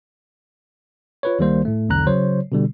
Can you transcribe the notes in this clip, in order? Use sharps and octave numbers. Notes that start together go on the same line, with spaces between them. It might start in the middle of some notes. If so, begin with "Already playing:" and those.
F4 B4 C#5
C#2 D#3 G3 A#3 C5
A2 A3
B1 E2 D3 A#5 F#6
C#3 F#3 C5 C#5
B2 D3 G3